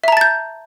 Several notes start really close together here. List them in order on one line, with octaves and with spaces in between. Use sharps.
E5 A#5 A5 A6 G6